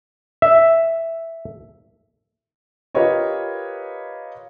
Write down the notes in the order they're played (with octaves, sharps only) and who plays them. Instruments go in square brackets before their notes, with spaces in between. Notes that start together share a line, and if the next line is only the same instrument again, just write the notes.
[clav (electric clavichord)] E5
[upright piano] F4 G4 A#4 B4 C#5 D#5